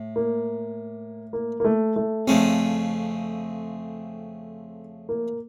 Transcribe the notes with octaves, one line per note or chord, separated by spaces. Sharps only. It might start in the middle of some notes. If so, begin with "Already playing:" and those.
Already playing: A2
A#3
A#3
A#3
A3
A3
F2 C#3 A3 C4 C#4
A#3